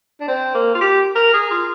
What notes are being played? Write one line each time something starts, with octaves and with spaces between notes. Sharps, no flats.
D4
C4
A#3
F4
G4
A#4
G#4
F4